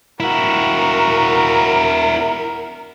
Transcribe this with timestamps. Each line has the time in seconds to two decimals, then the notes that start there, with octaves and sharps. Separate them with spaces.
0.20 E4 F#4 A#4